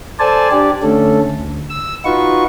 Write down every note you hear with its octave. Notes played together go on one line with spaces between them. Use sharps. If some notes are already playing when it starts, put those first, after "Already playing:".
A4 C5 D5 G#5 A5
D4 G4 D5
D3 A3 C#4 A4
D2
E6
D#4 F4 F#4 B4 C#6